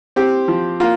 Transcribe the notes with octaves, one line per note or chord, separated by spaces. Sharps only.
C4 G4
F3
A#3 F4